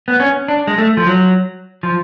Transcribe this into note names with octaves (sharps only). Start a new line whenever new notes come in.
B3
C#4
D4
G#3
A3
F3
F#3
F3